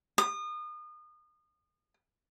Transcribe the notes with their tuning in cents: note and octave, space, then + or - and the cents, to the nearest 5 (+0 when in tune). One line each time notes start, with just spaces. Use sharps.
D#6 -35